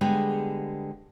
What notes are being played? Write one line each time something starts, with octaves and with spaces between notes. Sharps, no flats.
D3 G3 G#3 B3 G4 G#4